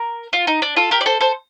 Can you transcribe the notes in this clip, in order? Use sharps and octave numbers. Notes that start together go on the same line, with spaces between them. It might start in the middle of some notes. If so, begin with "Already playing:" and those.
Already playing: A#4
F4
D#4
D4
F4 A4
G4 A#4
D5
A4 C5
A4 C5